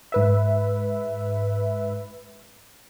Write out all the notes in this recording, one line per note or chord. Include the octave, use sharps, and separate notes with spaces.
G#2 B4 E5